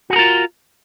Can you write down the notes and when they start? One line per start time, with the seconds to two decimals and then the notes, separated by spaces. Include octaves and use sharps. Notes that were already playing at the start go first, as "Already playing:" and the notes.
0.10 F#4
0.13 G#4
0.16 A#4
0.19 F4